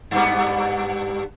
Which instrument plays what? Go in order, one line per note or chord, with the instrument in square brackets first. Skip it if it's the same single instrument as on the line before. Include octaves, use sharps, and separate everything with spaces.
[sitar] G2 G3 B3